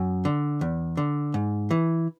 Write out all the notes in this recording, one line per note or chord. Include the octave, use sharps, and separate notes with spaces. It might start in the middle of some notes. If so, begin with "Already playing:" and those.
Already playing: F#2
D3
E2
D3
G#2
E3